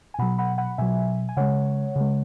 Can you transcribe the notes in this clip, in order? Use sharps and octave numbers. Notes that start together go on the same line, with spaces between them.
G#5
B2 F#3 F#5 B5
F#5 B5
F#5 B5
B2 F#3 E5 G#5
G#5
C#3 G#3 C#5 F#5
C#3 G#3